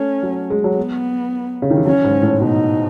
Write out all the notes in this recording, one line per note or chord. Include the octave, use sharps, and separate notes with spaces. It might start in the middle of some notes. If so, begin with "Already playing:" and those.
Already playing: A3 C#4
F#3
G#3
F#3
B3
C#3
D#3
E3
F#3 C#4
G#2
A2
B2 D#4